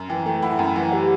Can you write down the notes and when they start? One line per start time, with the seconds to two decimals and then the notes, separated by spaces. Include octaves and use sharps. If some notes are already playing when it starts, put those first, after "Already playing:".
Already playing: F#2
0.09 E3 G5
0.26 A3 G5
0.42 E4 F#5
0.59 F#2 G5
0.75 E3 F#5
0.93 G4